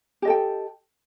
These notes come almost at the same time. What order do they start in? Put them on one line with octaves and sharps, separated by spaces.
G4 D#5 A4 G5